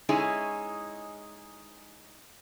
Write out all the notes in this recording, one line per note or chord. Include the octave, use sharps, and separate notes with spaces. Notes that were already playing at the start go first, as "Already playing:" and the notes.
G#3 C#4 D#4 E4 G#4